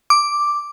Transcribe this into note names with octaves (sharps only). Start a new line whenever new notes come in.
D6